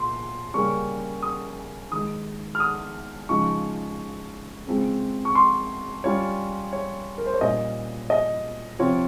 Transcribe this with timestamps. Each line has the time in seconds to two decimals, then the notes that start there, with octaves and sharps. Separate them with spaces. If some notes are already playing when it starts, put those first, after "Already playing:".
Already playing: A#2 C6
0.54 C#3 G3 A#3 C#4 C#6
1.23 D#6
1.91 D#3 G#3 D#4 D#6
2.55 F6
2.60 D#6
3.29 C#3 F3 G#3 D#4 C#6
4.67 C#3 G#3 C4 F4
5.25 C#6
5.35 C6
6.04 G3 C#4 F4 C#5
6.73 C#5
7.18 A#4
7.26 C5
7.34 C#5
7.41 A#2 G3 C#4 D#5
8.10 D#5
8.79 C3 F3 C4 F4 C#5